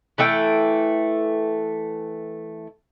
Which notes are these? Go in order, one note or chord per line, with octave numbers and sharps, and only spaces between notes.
E3 A3 A4 G5